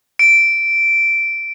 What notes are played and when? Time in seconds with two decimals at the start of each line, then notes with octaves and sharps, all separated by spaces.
0.19 D7